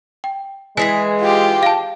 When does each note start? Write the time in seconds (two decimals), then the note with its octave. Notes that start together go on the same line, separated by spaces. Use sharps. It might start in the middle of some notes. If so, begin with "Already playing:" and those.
0.24 G5
0.77 E3 G#3 G#4 G#5 B6
1.21 F4 G4
1.63 F5 A5